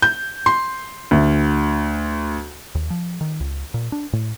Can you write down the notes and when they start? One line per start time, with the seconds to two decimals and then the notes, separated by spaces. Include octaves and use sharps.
0.02 G6
0.46 C6
1.11 D2
2.75 D#2
2.90 F3
3.21 D#3
3.40 C#2
3.74 A#2
3.92 D4
4.13 A2